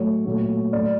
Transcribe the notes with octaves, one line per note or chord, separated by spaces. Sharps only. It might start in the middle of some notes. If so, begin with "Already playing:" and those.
Already playing: A2 F#3 A3 C#5
A#2 F#3 A3
A2 F#3 A3 D5